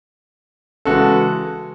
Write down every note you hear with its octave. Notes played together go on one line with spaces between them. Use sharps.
C#3 E3 G#3 F#4 A4